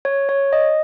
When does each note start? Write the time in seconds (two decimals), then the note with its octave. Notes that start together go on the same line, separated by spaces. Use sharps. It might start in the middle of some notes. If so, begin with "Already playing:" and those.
0.05 C#5
0.29 C#5
0.53 D#5